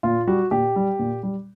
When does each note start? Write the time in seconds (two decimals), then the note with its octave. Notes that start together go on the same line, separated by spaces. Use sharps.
0.03 A#2 F4
0.27 G3 F#4
0.51 A#2 G4
0.76 G3
0.99 A#2
1.23 G3